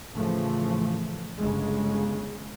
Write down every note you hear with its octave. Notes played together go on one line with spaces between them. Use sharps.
A2 C#3 E3 F3 A3
G1 C#3 G#3